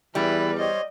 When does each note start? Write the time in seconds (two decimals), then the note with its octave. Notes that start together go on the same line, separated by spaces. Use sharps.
0.15 E2 E3 G3 E4 B4
0.59 C5 C#5 D#5